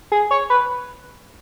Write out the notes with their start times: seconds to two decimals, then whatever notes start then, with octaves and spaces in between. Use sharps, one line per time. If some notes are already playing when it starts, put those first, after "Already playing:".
0.12 G#4
0.31 C#5
0.50 B4